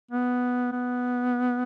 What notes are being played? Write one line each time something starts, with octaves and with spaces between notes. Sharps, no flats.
B3
B3